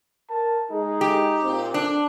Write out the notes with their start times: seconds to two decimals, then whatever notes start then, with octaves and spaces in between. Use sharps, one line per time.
0.30 A#4 A5
0.70 G#3 D#4 G#4
1.01 G4
1.42 A#2 C4
1.74 D4